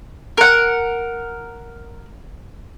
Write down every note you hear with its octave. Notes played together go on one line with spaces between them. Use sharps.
A#4 F#5